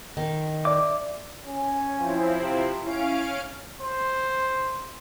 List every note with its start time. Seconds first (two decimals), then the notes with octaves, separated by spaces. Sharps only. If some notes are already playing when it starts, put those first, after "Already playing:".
0.17 D#3
0.65 D5 E5 D6
1.46 C#4
1.97 F3 C4 E4
2.41 C3
2.84 C#4 E4 F5 D7
3.81 C5